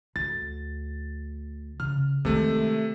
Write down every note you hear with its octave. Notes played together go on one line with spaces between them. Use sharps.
D2 A6
C#3 F6
C3 D#3 G#3 A3